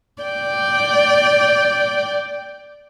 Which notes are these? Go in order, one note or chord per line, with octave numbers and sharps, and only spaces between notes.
D5 G5